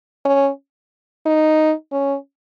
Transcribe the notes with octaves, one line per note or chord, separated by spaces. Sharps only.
C#4
D#4
C#4